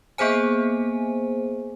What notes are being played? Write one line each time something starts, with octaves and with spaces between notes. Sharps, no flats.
A#3 B3 G#4 C5 G#5